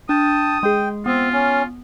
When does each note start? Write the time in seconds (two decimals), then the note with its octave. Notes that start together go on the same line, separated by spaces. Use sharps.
0.09 D4 G5 A5 D#6
0.63 G#3 G#4 G5
1.06 B3 C4 F4
1.33 C#4